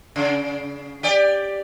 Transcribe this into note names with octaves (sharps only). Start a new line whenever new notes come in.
C#3
G4 D5